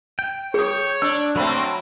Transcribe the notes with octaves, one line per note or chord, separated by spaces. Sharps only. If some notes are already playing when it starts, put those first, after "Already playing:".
G5
G#4 C#5 D#6
D4 E6
F#3 A3 A#3 C4 B5